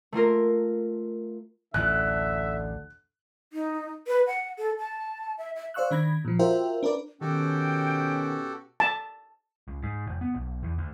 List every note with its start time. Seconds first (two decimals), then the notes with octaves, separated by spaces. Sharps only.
0.12 A3 A#3 F4 A#4
1.74 A1 D2 D3 E5 F#6
3.53 D#4
4.07 B4
4.27 F#5
4.58 A4
4.78 A5
5.38 E5
5.55 E5
5.74 C5 D5 F5 C#6 E6 F#6
5.91 D#3 D4 B5 G#6 A#6
6.25 A#2 F3
6.39 F4 F#4 A#4 C5 E5 G5
6.83 D4 A#4 B4 D5
7.21 B2 D#3 C#4 F#4 G4 A4 G5
8.80 A5
9.68 C#2
9.82 G#2
10.07 F1
10.21 B3
10.35 B1
10.63 E2
10.78 D2